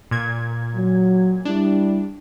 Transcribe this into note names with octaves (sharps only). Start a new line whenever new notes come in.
A#2 G#6
F#3
G3 D4 E4